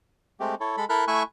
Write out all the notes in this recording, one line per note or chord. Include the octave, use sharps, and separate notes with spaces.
G#3 A3 C4 G4
E4 A4 C#5
G#3 A4 B5
E4 A4 A#4 B5 F#6
A3 E4 E5 G#5 C#6 F#6